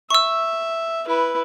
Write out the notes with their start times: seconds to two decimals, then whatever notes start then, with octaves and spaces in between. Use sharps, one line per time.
0.10 E5 C#6 E6
1.06 E4 B4